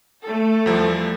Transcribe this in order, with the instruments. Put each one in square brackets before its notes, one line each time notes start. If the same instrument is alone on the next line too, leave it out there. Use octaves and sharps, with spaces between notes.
[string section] A3 A4
[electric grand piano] E2 F3 G3